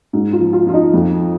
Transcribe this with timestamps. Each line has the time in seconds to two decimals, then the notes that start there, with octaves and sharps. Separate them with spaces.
0.13 G#2
0.33 F4
0.40 F3
0.53 F4
0.67 F3 F4
0.73 D#4
0.94 F2